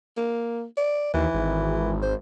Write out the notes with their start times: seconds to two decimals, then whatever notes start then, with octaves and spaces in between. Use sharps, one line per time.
0.18 A#3
0.77 D5
1.14 D#2 E3
1.34 G#1
2.03 C5